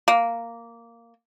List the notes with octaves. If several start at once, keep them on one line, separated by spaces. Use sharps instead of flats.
A#3